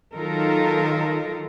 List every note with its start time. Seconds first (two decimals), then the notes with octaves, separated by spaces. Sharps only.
0.15 D#3 F#3 D#4 F4 A4 A#4